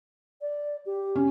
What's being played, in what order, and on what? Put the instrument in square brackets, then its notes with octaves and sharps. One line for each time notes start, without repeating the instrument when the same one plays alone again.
[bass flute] D5
G4
[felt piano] C#4